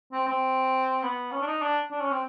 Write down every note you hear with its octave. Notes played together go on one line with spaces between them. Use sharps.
C4
C4
B3
C#4
D4
D#4
D4
D4
C#4
C4